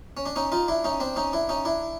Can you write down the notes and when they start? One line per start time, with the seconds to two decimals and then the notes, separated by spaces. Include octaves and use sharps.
0.17 C#4
0.26 D4
0.36 C#4 D#4
0.52 D#4 F4
0.68 D4 E4
0.84 C#4 D#4
1.00 C4 D4
1.16 C#4 D#4
1.33 D4 E4
1.49 C#4 D#4
1.65 D4 E4